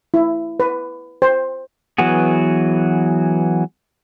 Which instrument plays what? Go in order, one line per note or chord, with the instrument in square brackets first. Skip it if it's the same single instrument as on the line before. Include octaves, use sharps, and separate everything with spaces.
[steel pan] E4
B4
C5
[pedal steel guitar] E3 F#3 B3 F#4 G#4